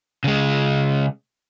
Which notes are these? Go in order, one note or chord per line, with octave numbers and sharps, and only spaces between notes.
C#3 G#3